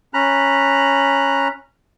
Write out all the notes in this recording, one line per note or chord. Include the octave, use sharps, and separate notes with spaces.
C#4 A#5 B5 F#6